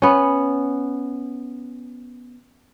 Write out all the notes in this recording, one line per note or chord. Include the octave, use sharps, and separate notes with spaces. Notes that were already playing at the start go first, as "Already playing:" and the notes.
B3 C#4